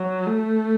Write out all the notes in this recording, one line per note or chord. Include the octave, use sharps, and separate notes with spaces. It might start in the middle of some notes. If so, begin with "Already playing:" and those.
Already playing: F#3
A3